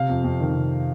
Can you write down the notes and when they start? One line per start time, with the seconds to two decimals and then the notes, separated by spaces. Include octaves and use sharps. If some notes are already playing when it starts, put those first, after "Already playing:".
Already playing: C3 F5
0.09 F2
0.24 F2
0.40 D#3
0.56 C3